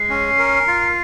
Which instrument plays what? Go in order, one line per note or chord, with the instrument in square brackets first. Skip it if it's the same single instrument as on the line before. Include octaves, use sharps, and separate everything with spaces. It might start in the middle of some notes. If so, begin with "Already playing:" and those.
Already playing: [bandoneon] G#3 [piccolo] C7
[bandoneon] C#4
A#4
F4